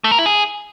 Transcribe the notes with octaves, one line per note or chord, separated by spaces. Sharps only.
A3
A#4
E4
G#4